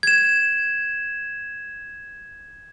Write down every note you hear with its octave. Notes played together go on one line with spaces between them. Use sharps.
G#6 E7